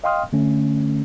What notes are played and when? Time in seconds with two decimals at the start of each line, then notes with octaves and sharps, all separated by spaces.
0.04 D#5 F5 G5 C6 D#6 F6
0.33 D3 A3 C#4